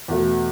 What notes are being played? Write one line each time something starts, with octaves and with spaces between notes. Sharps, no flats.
E2 B2 A3